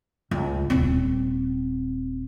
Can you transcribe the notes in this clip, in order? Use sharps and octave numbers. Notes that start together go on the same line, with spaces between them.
C#2
D#1 C4